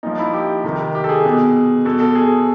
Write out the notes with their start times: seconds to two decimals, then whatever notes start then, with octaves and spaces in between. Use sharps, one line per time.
0.03 A#2 F3 D#4
0.19 E4
0.33 G4
0.64 C3 D#3
0.95 G4
1.04 A4
1.09 G#4
1.25 B2
1.85 B2 A4
2.00 A4
2.15 G#4